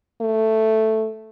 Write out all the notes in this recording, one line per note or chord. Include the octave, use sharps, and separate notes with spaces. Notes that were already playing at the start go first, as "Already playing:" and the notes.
A3